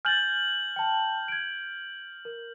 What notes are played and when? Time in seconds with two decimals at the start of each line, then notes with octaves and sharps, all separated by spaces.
0.05 G#5 F6 G6 A6 F#7
0.76 G5 A5
1.28 G#6 D7
2.25 A#4